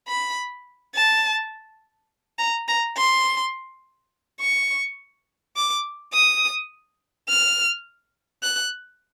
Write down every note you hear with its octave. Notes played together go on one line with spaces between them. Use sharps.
B5
A5
A#5
A#5
C6
C#6
D6
D#6
F6
F#6